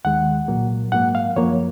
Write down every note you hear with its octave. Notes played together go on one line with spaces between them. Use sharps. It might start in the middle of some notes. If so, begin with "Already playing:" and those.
D#2 D#3 G#3 F#5
C2 A#2 F#3 A#3
G#2 F#3 A#3 F#5
F5
F#2 F3 A#3 C#5